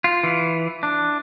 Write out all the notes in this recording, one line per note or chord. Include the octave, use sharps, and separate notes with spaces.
F4
E3
D4